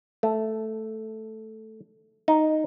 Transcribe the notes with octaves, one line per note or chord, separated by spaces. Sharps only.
A3
D#4